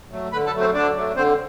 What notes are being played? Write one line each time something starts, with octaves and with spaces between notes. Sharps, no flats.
F#3 A3
D3 B4 B5
A4 A5
F#3 A3
C4 C5
D3 D4 D5
F#3 A3
D3 C4 C5